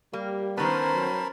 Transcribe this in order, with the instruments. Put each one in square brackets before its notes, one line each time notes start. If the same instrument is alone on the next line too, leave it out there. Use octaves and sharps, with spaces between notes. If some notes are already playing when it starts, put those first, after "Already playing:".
[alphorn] G3 [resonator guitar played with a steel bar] A#3 [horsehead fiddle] G4
[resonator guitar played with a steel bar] D#3 B3 [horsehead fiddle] C#4 C5 [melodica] A#4 A5 B5
[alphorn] F#3